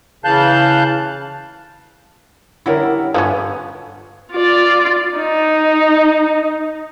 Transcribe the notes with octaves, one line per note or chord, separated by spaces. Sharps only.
C#3 E3 F5 A5 F#6 G6
D3 F#3 G3 E4 A#4
G2 F3 B3 C#4 A4
F4 D5
D#4